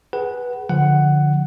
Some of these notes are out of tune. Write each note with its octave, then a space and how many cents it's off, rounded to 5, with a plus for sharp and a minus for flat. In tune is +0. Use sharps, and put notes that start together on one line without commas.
G#4 +0 B4 -10 F#5 +25
D3 +0 F3 +5 F#5 +10